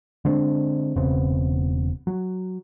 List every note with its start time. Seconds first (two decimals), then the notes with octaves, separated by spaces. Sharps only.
0.25 D3 G#3 C4 D4
0.96 E1 C#3 B3 C4
2.07 F#3